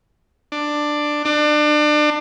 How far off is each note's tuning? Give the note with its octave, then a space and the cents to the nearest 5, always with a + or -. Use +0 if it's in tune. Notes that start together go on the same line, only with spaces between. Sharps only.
D4 +10
D4 +30